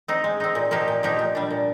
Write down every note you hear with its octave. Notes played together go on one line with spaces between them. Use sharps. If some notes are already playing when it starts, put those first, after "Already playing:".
C4 D#4
G#3
C4 D#4
A#2
F3 A#3 D#4 G4
A#2
F3 A#3 D#4 G4
A#2
G3 D4
A#2